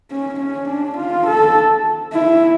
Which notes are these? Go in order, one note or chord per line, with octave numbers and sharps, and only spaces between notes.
C#4
C#4
D4
F4
A4
E4